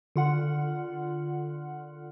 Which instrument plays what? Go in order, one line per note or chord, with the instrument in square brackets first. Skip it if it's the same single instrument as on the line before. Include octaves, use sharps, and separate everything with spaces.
[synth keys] D3 F4 F#5